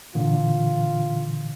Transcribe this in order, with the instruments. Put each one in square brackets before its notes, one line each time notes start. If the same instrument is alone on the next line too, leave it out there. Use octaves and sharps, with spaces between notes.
[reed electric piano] A#2 D3 E3 [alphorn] F4